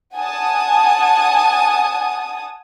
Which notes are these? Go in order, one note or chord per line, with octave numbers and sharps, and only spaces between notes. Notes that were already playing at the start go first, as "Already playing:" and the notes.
F#5 G#5 A5 D#6